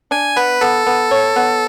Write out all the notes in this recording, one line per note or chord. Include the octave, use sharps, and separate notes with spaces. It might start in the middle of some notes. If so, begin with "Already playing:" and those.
D4 G#5
B3 B4
B3 A4
B3
C#5
B3